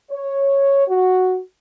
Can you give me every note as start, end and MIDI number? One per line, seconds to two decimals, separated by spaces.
0.10 0.87 73
0.87 1.39 66